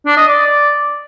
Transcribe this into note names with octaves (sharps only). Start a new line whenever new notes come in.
D4
D#5
D5